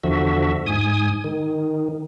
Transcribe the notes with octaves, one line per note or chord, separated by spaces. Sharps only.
E2 D3 F3 F#4 E5
G#2 G#5 D#6
D#3